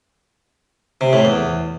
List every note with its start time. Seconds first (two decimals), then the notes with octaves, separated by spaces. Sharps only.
1.01 C3
1.13 A2
1.25 E2